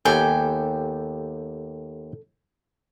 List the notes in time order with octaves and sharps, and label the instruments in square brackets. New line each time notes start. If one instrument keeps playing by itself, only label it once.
[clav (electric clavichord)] D#2 B3 G4 [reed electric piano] A4 [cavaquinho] G5 G#5